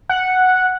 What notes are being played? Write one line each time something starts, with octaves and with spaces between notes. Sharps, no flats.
F#5